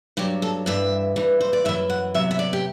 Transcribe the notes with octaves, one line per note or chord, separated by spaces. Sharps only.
G2 F#3 G4
A4
G2 E3 E5
G2 E3
C5
D5
F#2 E3 E5
F#5
E2 C3 F#3 E5
E5
D5
G4